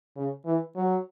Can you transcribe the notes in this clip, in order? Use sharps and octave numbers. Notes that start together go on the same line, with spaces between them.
C#3
E3
F#3